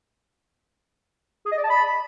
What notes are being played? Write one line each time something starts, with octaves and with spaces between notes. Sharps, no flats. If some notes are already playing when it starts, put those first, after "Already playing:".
G#4
D#5
D5
A5
B5